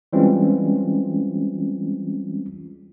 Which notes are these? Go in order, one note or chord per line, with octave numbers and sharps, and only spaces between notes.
E3 G3 G#3 C4 C#4 F4